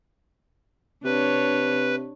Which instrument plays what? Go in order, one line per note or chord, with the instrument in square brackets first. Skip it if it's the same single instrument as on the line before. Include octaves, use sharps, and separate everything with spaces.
[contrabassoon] C3 [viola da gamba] D4 C#5 [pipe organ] B4